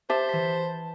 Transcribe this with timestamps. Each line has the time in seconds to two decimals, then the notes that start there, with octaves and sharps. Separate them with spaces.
0.10 G4 C5 E5 A5
0.29 E3 B6